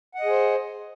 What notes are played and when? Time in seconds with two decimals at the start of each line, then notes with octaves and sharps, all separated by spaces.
0.15 F#5
0.20 D#5
0.25 G#4
0.30 C5